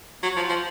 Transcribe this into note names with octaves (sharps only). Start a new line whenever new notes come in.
F#3
F3
F3